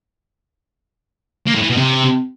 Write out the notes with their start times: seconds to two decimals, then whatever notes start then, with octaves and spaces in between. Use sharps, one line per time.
1.47 A#3
1.55 A2
1.62 E3
1.70 B2
1.77 C3